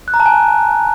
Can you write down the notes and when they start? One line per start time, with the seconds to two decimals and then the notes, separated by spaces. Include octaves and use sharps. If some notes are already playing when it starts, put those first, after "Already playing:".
0.08 F#6
0.14 A#5
0.20 A5
0.26 G#5